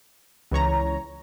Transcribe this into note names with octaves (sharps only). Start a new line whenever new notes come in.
C#2 E3 C#5 A#5